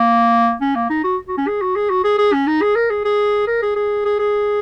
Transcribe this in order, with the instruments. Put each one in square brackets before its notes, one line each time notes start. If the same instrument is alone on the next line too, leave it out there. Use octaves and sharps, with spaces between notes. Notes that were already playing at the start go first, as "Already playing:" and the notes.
Already playing: [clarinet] A#3
C#4
A#3
D#4
F#4
F#4
C#4
G#4
F#4
G#4
F#4
G#4
G#4
C#4
D#4
G#4
A#4
G#4
G#4
A#4
G#4
G#4
G#4
G#4